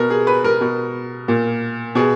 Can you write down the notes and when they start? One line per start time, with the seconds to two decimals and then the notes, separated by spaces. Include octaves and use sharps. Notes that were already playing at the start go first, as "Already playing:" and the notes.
Already playing: B2 A#4
0.10 G#4
0.27 B4
0.44 A#4
0.61 B2
1.28 A#2
1.95 B2 G#4